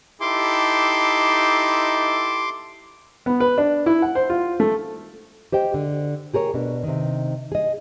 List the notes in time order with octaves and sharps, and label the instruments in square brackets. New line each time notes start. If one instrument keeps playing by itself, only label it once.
[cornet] D#4 [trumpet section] E4 G4 A4 [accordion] C6 D6
[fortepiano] B3
B4
D4
E4
F#5
C5
F4
A3
[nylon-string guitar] G4 C5 D#5 G5
D3
G4 G#4 A#4 C#5
B2 D4
C3 D#3
G#4 D#5